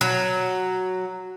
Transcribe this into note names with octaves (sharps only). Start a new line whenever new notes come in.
F#3